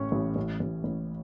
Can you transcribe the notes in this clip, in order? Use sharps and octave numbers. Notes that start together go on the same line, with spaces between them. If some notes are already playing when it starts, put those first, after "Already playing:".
Already playing: A1 A2 C#4 C#6
A1
A1
A1
A1